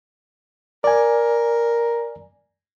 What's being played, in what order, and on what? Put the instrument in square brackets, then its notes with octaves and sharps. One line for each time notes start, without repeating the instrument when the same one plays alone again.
[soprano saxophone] A#4 [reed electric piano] D5 G#5